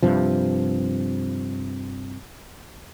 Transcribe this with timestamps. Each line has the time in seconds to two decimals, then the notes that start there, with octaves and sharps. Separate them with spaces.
0.03 G2 C3 F3